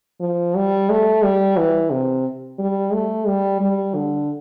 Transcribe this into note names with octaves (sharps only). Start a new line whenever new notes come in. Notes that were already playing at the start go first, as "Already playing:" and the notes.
F3
G3
A3
G3
E3
C3
G3
A3
G3
G3
D3